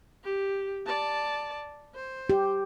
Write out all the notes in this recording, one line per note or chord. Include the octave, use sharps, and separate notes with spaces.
G4
D5 A5
C5
G4